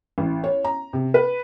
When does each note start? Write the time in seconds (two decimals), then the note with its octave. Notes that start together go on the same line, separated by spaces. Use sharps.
0.18 A1
0.44 C#5
0.64 A#5
0.93 C3
1.14 B4